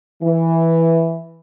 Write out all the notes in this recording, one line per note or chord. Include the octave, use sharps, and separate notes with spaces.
E3